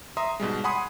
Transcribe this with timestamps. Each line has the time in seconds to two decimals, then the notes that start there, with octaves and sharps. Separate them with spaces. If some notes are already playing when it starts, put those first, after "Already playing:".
0.17 E5 A#5 C6 D#6
0.40 G#2 B2 G3 G#3
0.64 F#5 G#5 B5 C6 D#6 G#6